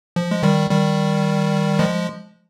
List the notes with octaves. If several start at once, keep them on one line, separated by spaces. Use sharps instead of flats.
F3
G#3
D#3 G3
D#3 G3
F3 G#3